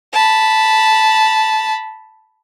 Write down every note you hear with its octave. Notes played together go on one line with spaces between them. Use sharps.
A5 B5